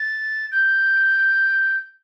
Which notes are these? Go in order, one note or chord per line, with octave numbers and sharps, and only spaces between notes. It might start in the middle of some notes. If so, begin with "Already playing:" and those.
Already playing: A6
G6